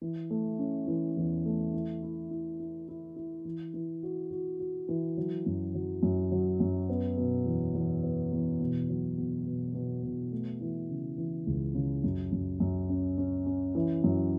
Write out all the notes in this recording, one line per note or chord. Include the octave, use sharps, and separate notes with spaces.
E3
A3
C#4
E3
E2
A3
E3
E4
E4
E4
E4
E4
E3
E3
F#4
F#4
F#4
E3
F#3
F#2
F#3
F#2
F#3
F#2
B3
B2
E2
E2
B3
E2
B2
F#3
B2
B2
B2
B2
A3
E3
C#3
E3
C#2
C#3
F#2
F#2
F#2
C#4
C#4
C#4
E3
F#2